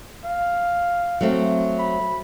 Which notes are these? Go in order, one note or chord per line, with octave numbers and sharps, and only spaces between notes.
F5
F#3 A3 C4
B5